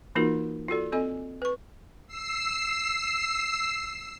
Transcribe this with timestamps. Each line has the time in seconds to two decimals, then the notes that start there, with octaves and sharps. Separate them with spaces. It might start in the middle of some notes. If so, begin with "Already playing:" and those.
0.15 E3 A#3 D#4 F4 F#4 A#4
0.68 F4 F#4 A4 D5
0.92 C4 A4 D#5 G#5
1.42 B4 C#6
2.07 E6 C7